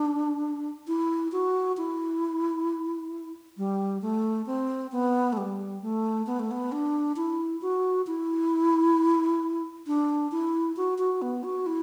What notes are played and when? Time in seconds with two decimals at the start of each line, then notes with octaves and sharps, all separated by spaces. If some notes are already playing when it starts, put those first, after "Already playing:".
Already playing: D4
0.88 E4
1.32 F#4
1.77 E4
3.58 G3
4.02 A3
4.46 C4
4.92 B3
5.33 A3
5.37 G3
5.82 A3
6.27 B3
6.40 A3
6.51 B3
6.72 D4
7.16 E4
7.62 F#4
8.07 E4
9.87 D4
10.32 E4
10.77 F#4
10.99 F#4
11.22 B3
11.44 F#4
11.66 E4